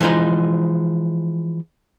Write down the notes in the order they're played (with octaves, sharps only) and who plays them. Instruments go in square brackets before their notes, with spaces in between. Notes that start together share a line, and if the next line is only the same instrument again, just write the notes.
[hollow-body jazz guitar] E3 F3 G#3 D#4 C5